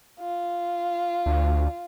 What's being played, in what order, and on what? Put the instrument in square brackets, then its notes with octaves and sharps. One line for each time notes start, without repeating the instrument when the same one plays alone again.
[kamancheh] F4
[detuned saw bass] D2